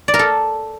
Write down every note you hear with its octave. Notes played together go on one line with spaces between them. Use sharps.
D5
A#4
A4